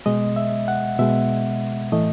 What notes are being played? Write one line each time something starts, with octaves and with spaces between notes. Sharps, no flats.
B2 G#3 D#5
E5
F#5
B2 G#3 E5
A2 E3 A3 D#5